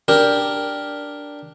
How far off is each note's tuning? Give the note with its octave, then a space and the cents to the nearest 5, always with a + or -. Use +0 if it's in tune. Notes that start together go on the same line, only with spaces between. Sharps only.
D4 +0 G4 +0 A#4 +0